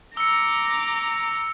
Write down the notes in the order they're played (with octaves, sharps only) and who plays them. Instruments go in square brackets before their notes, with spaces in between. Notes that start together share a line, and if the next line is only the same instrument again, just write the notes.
[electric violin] A#5 D6 [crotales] E6 C#7